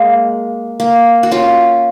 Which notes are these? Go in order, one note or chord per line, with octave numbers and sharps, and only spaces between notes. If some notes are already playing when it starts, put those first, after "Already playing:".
Already playing: G#3 A#3
A#3
F#4
C#4 F4